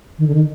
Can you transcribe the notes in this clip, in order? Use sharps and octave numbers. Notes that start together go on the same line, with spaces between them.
D#3
D3
D#3